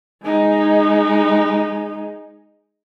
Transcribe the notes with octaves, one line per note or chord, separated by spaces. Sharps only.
G#3 D#4